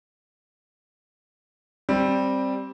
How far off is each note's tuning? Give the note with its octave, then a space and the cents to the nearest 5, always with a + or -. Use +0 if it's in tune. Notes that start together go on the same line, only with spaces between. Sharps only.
G3 +0 C4 +10